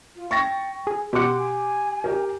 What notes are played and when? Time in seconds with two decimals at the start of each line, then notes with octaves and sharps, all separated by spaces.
0.16 F4
0.31 G5 C#6 A6 A#6
0.87 G#4
1.13 B2 G4 F#5 C6 D6
1.39 G#5
2.04 G4 A#4